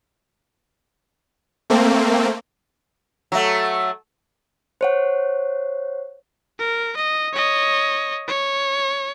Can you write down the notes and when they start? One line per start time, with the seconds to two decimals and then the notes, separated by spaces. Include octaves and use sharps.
1.70 A3 A#3 C4
3.32 F#3 A3
4.81 C5 C#5 F#5
6.59 A#4
6.96 D#5
7.33 C#5 D#5
8.28 C#5